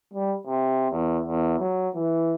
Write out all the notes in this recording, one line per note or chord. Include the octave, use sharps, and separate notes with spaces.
G3
C3
E2
E2
F#3
E3